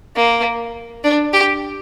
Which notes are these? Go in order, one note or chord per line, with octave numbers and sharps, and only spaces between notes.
A#3
D4
G4